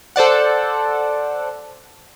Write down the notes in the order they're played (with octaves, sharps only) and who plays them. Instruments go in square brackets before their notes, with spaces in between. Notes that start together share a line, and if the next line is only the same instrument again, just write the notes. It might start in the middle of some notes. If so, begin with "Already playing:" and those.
[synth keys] A4 C5 D5 F#5